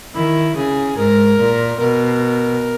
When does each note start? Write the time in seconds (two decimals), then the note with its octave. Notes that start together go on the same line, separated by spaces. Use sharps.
0.15 D#3 E4
0.56 C#3 G#4
0.97 G#2 A#4
1.39 A#2
1.79 B2 A#4